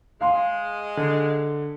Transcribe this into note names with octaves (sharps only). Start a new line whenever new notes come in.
G#3 F5 C6
D3